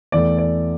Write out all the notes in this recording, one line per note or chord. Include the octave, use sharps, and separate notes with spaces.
E2 E3 A3 D5
D5